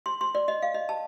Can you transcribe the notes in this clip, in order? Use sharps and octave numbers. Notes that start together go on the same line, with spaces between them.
C6
C6
D5
D#5
F5
D#5
A5